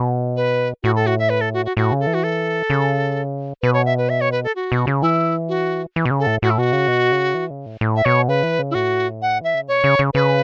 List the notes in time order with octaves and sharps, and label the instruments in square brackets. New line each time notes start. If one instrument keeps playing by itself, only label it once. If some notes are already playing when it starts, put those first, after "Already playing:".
Already playing: [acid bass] B2
[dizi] B4
[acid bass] A2 [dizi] F#4
[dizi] A4
F#4
E5
B4
A4
F#4
F#4
[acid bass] A2 [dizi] F#4
[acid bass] C#3
[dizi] A4
[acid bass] E3
[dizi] F#4
A4
[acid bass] C#3
[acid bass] B2 [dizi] B4
[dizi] C#5
E5
B4
E5
C#5
B4
A4
F#4
[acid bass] B2
C#3
[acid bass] E3 [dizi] E4
[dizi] F#4
[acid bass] E3
B2
C#3
[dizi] A4
[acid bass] A2
[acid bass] A2 [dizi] F#4
[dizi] E4
[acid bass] B2 [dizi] F#4
[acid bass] C#3
B2
C#3
E3
C#3
A2
A2
[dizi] E5
[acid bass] B2 [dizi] C#5
[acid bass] C#3 [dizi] B4
[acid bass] E3
C#3
[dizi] E4
[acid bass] A2 [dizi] F#4
[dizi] F#5
[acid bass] E3 [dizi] E5
[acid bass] C#3
[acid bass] B2 [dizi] C#5
[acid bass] C#3
C#3
[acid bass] C#3 [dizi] B4